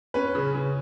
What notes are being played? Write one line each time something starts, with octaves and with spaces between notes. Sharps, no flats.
C#4 B4
C#3
C#3